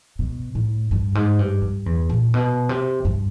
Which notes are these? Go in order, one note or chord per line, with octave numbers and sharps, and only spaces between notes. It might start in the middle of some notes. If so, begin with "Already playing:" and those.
B2
A2
G2
G#2
G2
G2
E2
A#2
B2
C3
G2